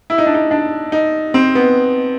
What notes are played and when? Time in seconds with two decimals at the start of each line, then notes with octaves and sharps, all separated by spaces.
0.10 E4
0.18 D#4
0.26 D4
0.35 D#4
0.51 D4
0.92 D#4
1.34 C4
1.55 B3